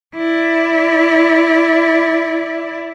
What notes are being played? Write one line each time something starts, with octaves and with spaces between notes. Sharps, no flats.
E4 D5